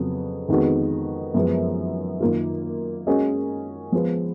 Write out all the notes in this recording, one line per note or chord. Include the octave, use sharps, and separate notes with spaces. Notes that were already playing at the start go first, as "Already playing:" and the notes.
Already playing: F2 C#3 F#3 B3
F2 D#3 G#3 B3 F#4
F#2 F3 G#3 B3
F#2 D#3 A#3 F4
G#3 C#4 F#4 A#4 D#5
F3 G#3 B3 F4 B4